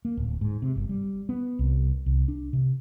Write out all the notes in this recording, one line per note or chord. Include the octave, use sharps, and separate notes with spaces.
A#3
D1
G#2
C3
G1
G3
B3
C2
C2
D4
C3